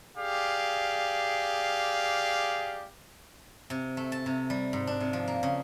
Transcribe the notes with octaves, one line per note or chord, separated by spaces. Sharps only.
G4 G#4 D5 F5
C3
A3
A5
C3
G3
G#2
D4
C3
F3
A#3
C#3